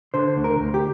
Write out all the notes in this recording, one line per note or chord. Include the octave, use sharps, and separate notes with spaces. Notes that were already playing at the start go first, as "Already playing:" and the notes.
D3 C5
D2
A#4
D2
G4